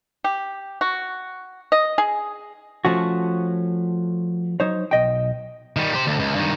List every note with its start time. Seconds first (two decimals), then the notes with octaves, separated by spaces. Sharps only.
0.24 G4
0.81 F#4
1.72 D#5
1.98 G#4
2.85 F3 A3 C#4 F#4
4.60 F#3 D#4 C5 C#5
4.91 B1 D#5 G5
5.77 D#3 G3
5.94 G4 C5
6.07 D2
6.19 C#2
6.35 G2 D#3